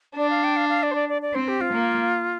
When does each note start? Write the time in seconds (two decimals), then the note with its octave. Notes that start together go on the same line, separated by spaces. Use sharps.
0.17 D4 D5
0.30 F5
0.44 G5
0.57 F5
0.69 F5
0.83 D5
0.91 C5
0.95 D5
1.09 D5
1.22 D5
1.35 C4 C5
1.48 G4
1.61 F4
1.74 A#3